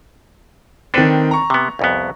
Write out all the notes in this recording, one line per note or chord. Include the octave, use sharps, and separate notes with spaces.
D#3 C4 D4 A4 B4
A#5 C#6
C3 B3
C2 F2 B3